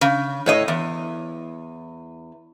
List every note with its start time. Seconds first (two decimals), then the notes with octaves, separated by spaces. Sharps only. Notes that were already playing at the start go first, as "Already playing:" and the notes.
0.01 C#3
0.46 A2 C#5 D#5
0.68 E2